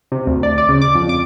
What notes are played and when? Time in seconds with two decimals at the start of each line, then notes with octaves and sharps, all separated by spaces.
0.12 C3
0.27 D2
0.43 D5
0.58 D5
0.69 C#3
0.82 D6
0.95 F2
1.09 D6